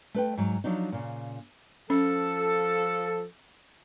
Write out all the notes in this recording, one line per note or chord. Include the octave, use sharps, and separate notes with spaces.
A3 B4 G5
G#2 F#3
F3 F#3 D4 D#4
A#2 C#3
F3 C#4 A4